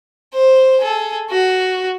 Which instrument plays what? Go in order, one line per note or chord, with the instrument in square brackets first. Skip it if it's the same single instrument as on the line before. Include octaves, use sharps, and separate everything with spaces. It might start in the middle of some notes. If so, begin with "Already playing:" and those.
[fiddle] C5
G#4 A4
F#4